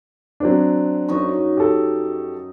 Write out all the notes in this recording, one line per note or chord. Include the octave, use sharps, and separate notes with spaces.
F#3 C4 D4
F#2 D#4 C#6
G4 A4